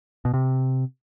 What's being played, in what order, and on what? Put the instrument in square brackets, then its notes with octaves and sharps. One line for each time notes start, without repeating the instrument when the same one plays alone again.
[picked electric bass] B2
C3